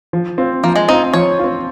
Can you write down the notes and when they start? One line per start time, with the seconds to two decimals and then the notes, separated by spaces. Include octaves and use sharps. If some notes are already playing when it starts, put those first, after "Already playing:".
0.13 F3
0.38 C4 F4
0.64 F3 A#3
0.76 G#3
0.88 C4 D#4 F4
1.14 F3 C#5
1.39 C4 F4